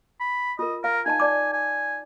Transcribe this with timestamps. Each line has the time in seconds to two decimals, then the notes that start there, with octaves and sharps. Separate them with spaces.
0.20 B5
0.59 F4 A#4 D#5
0.84 A#4 F5
1.06 D#4 D#5 G#5 A5
1.20 D5 A5 D6
1.53 G#5